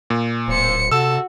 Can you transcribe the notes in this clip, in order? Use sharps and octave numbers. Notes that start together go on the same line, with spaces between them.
A#2
D1 C5 C#7
C3 F#4 A4 E6